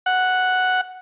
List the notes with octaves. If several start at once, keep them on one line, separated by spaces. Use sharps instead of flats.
F#5